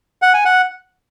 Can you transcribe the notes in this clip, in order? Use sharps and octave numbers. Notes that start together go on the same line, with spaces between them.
F#5
G#5
F#5